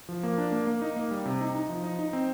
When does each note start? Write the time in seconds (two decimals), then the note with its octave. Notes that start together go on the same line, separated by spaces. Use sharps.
0.09 F3
0.23 A#3
0.38 D4
0.52 A#3
0.67 A#3
0.82 D#4
0.96 A#3
1.11 G3
1.25 C3
1.40 D#4
1.55 D#4
1.69 F3
1.84 D#4
1.99 D#4
2.13 C4